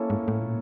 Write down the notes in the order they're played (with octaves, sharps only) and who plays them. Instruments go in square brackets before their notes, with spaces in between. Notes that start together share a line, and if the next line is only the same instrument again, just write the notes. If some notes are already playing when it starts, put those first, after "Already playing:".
Already playing: [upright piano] A#3 C#4 E4 A4
[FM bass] G#2
A2
A#2